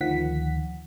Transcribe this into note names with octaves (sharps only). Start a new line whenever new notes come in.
D2 D#3 F3 F#5 B6